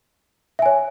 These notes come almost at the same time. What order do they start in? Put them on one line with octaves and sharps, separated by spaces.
E5 G#5 C#5